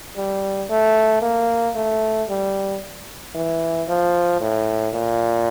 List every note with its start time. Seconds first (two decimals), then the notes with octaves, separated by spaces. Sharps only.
0.16 G3
0.70 A3
1.22 A#3
1.76 A3
2.29 G3
3.35 E3
3.88 F3
4.41 A2
4.94 A#2